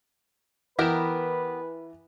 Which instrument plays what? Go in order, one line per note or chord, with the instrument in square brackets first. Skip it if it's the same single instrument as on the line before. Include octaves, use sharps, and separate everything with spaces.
[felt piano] E3 E7 [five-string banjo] B3 G4 A#4 [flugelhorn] B4